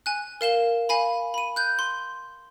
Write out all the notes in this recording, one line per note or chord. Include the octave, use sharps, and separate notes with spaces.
G#5 F#6
A#4 F5 E7 G7
F5 G#5 B5
B5 D#7
F#6 G6
C6